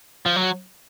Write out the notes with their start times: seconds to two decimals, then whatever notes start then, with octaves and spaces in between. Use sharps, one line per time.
0.26 F3
0.36 F#3